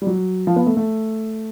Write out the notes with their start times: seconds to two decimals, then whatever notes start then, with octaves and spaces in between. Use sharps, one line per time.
0.02 G3
0.07 F#3
0.47 F3
0.56 B3
0.66 A3
0.77 A3